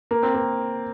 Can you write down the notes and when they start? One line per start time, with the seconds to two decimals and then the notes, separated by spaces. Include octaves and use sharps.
0.11 A#3
0.23 C4
0.34 A#3